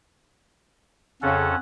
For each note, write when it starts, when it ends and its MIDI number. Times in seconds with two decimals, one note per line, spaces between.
1.22 1.55 41
1.22 1.48 49
1.22 1.55 61
1.22 1.55 69
1.22 1.58 78